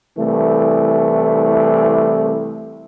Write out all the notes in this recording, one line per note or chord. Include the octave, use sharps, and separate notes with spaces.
C2 E3 A3